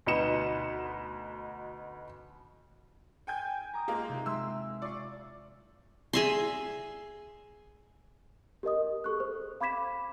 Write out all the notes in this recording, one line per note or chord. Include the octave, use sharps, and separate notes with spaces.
D2 B2 D#4 B4 C#7 E7
G5 G#5 G6
A#5 D6 D#6
G#3 A#3 F4
C3 D#4
G#3 E5 C6 E6
F4 D5 C#6 C7
G#4 E5 C6
G4 A#4 D#5 D#6
G#4 A4 C#6 F#6
C5
F5 B5 D6 G#6 B6 E7